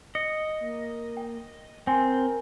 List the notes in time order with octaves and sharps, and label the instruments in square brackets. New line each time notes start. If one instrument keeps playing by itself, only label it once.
[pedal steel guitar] D#5 [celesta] C#7
[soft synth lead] A#3
[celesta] G5
[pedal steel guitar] C4 [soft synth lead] A#4 [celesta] G5 G#5 C6